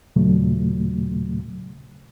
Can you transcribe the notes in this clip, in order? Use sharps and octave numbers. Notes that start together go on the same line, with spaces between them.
D#2 A#2 C#3 F#3 A3